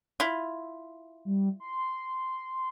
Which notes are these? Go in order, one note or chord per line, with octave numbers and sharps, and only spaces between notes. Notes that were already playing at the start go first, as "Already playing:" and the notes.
E4 F4
G3
C6